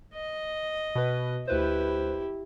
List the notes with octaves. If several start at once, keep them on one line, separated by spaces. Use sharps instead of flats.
D#5
B2 B4
D2 E4 G4 B4 C5